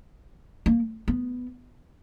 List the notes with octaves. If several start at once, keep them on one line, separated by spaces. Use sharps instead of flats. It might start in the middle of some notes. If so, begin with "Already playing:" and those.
A#3
B3